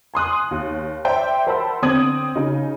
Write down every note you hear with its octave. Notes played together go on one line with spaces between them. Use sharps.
G#5 C6 D#6 F#6
D#2
C5 D5 E5 G5
A#4 C5 F#5 A5 B5 E6
D3 C4 D#6 G#6 F#7
C#3 D#4